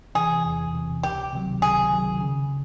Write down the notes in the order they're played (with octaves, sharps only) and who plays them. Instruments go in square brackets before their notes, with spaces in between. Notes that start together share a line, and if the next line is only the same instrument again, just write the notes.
[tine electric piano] C3 E3 [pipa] G#4
[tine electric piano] E2
C3 E3
[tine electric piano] C#2 [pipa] G4
[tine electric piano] C3 D#3 F#3
[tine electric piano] C#2 [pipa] G#4
[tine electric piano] C3 D#3 F#3
C#3